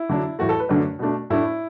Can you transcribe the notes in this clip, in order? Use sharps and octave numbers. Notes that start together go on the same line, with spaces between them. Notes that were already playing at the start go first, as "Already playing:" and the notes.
Already playing: E4
D3 F#3 D4
A2 E3 A3 F#4
A4
B4
F#2 D3 A3 D4
B2 A3 D4
A2 A3 D4 E4